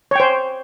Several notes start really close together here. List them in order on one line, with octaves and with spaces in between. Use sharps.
C#5 G5 C5